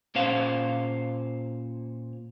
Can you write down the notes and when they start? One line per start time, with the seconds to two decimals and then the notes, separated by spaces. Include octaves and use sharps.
0.15 A#2 C#4 C5 F5